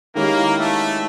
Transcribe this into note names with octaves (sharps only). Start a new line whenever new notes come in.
D#3 G#3 A#3 C#4 E4 G4
A3